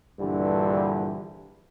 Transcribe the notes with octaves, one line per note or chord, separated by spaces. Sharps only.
A#1 G2 D3 E3 G3